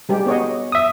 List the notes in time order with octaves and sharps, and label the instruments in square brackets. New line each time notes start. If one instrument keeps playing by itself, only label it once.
[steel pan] G3 G#3 G4
B3 C#5 D#5
[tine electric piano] E5 D#6